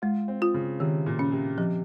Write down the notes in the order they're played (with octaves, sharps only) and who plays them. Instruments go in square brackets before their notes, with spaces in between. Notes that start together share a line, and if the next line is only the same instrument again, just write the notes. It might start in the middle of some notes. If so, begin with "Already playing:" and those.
[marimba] G#3 [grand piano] F4
[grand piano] C4
[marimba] F4
[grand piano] C#3
[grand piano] C3 [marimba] D#3
[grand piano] A#2
[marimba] C#4
[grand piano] C3
[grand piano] C3 [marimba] F3